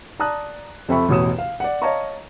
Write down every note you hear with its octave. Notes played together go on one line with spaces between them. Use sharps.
D5 A5 A#5 D#6 F#6
F2 C4 A4 E5 B5 C#6
A1 E2 B2 C#5 D#6 E7
F5
D5 F#5
C#5 D#5 F5 A5 A#5 C#6